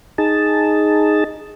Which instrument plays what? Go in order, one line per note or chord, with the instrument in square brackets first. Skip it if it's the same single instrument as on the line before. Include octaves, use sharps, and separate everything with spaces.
[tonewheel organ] D#4 G#4 A5